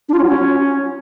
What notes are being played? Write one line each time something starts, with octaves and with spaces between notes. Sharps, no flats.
D4
F4
C#4
F#3
C#4